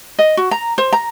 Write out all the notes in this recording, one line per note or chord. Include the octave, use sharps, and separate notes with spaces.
D#5
F#4
A#5
C5
A#5